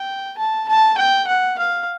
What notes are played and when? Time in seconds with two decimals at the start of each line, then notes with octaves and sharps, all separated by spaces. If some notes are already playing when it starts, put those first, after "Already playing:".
Already playing: G5
0.38 A5
0.68 A5
0.98 G5
1.28 F#5
1.58 F5